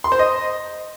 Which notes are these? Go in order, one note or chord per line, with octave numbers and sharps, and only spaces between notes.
C6
C5
D#5